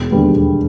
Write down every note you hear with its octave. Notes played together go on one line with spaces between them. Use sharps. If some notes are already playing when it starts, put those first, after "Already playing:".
Already playing: E1
D#2 D3 G3 B3
E1